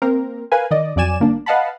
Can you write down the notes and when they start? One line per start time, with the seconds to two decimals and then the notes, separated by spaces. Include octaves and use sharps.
0.02 A#3 C4 A#4
0.52 A#4 B4 F5 G#5
0.71 D#3 D5 D#5
0.96 F2 F#3 D5 G#5 E7
1.20 G1 A#3 D4
1.46 B4 D#5 F5 F#5 A5 B5